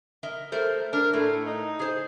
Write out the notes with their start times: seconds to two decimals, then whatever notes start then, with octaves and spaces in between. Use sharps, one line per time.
0.23 A#4 D#5 E5
0.52 A3 A#4 C5
0.93 D4 A#4
1.13 A2 A3
1.46 D#4
1.79 G#4 C5